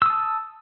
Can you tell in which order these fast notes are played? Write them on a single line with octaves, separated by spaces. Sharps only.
E6 D#6 A5